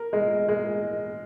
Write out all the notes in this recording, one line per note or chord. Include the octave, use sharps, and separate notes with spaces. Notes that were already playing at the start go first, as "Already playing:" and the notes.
Already playing: A#4
G#3
G#3